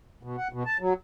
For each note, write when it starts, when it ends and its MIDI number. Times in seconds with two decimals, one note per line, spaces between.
0.23 0.36 47
0.38 0.48 78
0.53 0.63 47
0.66 0.77 81
0.80 0.93 54